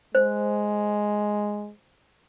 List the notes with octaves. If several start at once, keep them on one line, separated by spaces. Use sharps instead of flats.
G#3 C5